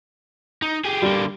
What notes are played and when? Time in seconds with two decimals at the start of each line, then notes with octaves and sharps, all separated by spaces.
0.62 D#4
0.85 G4 G#4
1.02 D3 G3 A#3